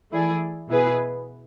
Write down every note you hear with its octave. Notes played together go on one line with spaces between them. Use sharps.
E3 A3 E4 G#4 D5
B2 B3 E4 G#4 B4